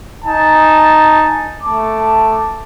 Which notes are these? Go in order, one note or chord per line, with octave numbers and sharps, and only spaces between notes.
D#4 G#5 A5
A3 A5 D6